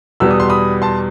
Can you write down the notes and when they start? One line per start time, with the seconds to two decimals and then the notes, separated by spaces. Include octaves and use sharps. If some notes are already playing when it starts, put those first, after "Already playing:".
0.20 E2 B2 G3 B3 E6
0.31 D#6
0.40 C6
0.50 B5 D#6
0.82 A5 C6